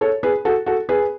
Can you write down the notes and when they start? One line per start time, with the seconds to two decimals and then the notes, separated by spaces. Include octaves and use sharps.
0.01 A4 C#5
0.23 G#4 B4
0.45 F#4 A4
0.66 F#4 A4
0.89 G#4 B4